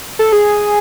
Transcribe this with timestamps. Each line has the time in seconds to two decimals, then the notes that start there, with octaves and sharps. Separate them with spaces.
0.19 A4
0.32 G#4